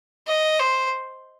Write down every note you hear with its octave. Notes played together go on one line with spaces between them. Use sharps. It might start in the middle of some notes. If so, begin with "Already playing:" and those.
D#5
C5